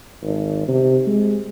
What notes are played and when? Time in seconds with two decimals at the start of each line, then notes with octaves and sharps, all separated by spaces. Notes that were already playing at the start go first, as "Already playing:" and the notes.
0.22 G#1
0.68 C3
1.07 G#3